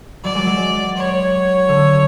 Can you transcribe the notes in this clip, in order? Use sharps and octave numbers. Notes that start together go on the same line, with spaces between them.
F#3 D5
G#3
F#3
C#5
D3